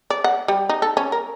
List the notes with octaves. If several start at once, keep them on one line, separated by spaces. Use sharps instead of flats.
D5
F#5
G3
D#4
A4
C#4
A#4